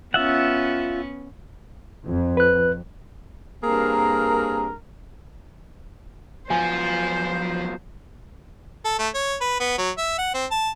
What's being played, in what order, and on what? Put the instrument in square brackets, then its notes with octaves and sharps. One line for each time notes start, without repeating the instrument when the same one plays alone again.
[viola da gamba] B3 C#4 [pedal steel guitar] F4 E5 F#5
[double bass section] F2
[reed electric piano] B4 F#6
[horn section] G2 A#3 C4 G#4 A#4
[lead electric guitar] F3 [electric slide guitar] F#3 B3 F4 [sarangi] C5 [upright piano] G#5
[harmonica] A4
A3
C#5
B4
B3
F#3
E5
F#5
C4
A5